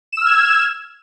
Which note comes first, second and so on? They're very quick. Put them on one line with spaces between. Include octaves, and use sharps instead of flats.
E7 E6 F6 G#6